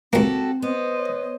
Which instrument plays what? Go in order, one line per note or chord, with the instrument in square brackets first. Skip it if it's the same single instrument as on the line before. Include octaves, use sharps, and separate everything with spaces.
[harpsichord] C#2 A#3 [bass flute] C4 [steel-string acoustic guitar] F#4 G4 A4
[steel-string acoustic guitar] B3 [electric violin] C5 D#5
[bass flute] C#5